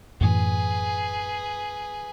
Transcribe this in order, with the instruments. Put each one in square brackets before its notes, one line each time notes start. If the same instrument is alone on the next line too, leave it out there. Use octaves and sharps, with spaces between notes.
[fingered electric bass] F#2 A2 E3 [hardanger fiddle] G#4 B4